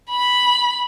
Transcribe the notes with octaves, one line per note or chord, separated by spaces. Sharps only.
B5